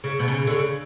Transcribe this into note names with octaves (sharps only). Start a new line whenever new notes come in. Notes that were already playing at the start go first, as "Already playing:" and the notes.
C#3
B2
C#3
D3
C#3